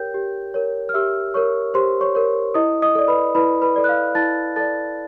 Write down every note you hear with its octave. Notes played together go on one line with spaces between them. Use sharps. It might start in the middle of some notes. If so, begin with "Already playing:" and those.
Already playing: G4 A#4 C#5 G5 G6
G4
A#4 C#5
F6
G4 E5 E6
A#4 C#5 C#6
G4 C5 C6
C#5 C#6
A#4 C#5
E4 D#5 D#6
D#5 D#6
A4 D5
B4 B5
E4 B4 B5
B4 B5
A4 D5
F#6
F5 F6
E4 A5 A6
A4 D5 A5 A6